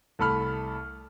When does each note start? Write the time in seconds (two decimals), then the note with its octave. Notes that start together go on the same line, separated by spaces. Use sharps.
0.19 C2 A3 A4 B5 F6